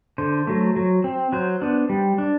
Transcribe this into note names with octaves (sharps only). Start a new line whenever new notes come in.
D3 C5
F#3 A3
F#3
C4
F#3 C5
B3 D4
G3
D4